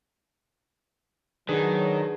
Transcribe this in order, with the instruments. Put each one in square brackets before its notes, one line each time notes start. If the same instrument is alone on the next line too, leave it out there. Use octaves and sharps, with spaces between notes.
[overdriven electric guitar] D#3 [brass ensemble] F#3 [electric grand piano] D4 G#4 B4